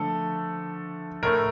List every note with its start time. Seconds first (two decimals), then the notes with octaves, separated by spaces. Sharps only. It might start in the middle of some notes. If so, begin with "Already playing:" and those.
Already playing: D3 F3 A3 A4
1.23 A2 A3 A#4